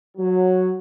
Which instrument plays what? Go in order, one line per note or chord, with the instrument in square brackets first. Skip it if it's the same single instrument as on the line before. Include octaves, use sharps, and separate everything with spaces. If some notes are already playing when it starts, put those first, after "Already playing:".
[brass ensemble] F#3